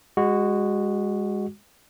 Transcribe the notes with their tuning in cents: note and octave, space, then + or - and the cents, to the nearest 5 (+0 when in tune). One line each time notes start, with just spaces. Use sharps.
G#3 -25 F#4 +0